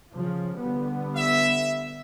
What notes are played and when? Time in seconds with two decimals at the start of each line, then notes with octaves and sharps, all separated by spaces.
0.13 C#3 F3
0.58 D3 G3 B3
1.17 E5